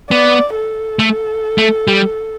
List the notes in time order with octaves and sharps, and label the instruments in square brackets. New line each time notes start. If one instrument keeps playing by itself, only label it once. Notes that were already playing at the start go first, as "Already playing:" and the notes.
[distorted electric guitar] B3 [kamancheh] D5
[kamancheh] A4
[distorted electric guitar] A3
A3
G3